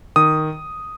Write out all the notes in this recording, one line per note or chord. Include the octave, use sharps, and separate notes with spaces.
D#3 D#6